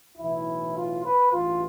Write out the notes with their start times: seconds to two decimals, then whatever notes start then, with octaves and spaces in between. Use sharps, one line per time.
0.17 B1 A2 E3 E4
0.75 F4
1.03 B4
1.32 A1 G2 E3 F4